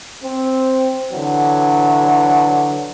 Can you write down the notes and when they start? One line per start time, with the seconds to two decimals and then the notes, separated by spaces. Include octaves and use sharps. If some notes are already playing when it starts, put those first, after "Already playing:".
0.23 C4
1.12 D3 E3 F#3